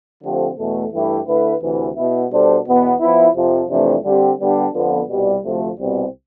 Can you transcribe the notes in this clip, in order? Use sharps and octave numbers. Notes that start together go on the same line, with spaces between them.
D3 F3 A3 C4 G4
E2 B2 A3
G2 E3 A3 E4 G4
D3 A3 E4 B4
D2 C3 E3
B2 B3 E4
B2 G3 D4 A4 C5
E2 B2 B3
F3 B3 E4
F2 C3 F3
F2 C3 E3 A3 D4
D3 G3 C4 G4
D3 G3 B3 D4 G4
F2 D3 F3 B3
C2 B2 G3
D2 C3 F3 A3
C2 B2 G3 C4